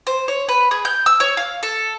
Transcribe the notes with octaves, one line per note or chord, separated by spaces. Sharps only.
C5
C#5
B4
G#4
G6
E6
C#5
F5
A4